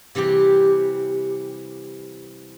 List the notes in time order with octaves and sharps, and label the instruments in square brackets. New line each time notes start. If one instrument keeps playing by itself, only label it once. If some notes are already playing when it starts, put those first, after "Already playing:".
[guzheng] C3 E3 G3 G4